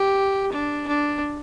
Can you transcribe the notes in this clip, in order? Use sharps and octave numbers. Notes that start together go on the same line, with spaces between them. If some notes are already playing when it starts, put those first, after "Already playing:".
Already playing: G4
D4
D4